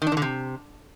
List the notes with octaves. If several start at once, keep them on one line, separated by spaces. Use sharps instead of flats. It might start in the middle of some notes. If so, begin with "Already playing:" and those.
D#3
D4
D#3
D3
C3